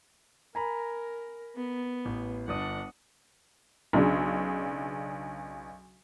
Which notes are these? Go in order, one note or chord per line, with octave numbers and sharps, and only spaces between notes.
A#4 G#5 A#5 B5
B3
A1
G1 D4 D5 F#5 D#6
B1 C#3 D4 G#4